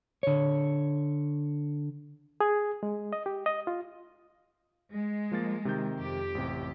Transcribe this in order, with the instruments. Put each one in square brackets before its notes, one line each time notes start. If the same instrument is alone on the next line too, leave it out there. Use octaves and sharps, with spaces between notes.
[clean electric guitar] D3 C#5
[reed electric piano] G#4
G#3
D#5
G4
D#5
F4
[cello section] G#3
[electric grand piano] F3 A#3 A6
C3 D#3 G6
[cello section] F2 G4
[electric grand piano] A1 C3